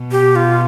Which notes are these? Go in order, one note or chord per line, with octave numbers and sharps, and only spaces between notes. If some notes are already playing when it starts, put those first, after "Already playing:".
Already playing: B2
G4
F4